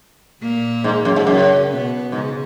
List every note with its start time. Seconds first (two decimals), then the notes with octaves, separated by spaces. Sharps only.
0.42 A#2 A#3
0.84 G#2
1.05 F#2
1.16 G#2
1.27 F#2 C#3 C#4
1.70 B2 B3
2.12 G#2 C#3 C#4